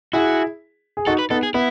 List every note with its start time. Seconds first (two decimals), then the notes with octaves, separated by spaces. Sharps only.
0.13 E4 F#4 G#4
0.97 G#4
1.06 D#4 F#4 A4
1.19 B4
1.30 B3 D#4 A4
1.43 G#4
1.54 B3 E4